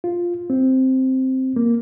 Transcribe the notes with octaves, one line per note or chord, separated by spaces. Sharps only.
F4
C4
A#3